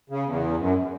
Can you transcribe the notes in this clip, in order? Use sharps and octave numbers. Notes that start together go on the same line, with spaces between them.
C#3
E2
F#2